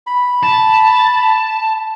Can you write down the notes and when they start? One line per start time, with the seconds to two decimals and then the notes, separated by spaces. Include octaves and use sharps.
0.07 B5
0.43 A5